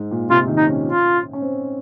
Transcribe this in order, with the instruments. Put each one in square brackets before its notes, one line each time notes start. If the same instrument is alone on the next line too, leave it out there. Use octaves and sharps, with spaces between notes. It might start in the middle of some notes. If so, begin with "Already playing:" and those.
Already playing: [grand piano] G#2
A#2
[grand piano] C3 [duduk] F4
[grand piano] D#3
[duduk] D#4
[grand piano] C#4
[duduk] F4
[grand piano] C#4
C4